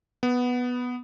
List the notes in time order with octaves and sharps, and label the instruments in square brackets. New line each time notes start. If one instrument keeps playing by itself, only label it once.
[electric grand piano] B3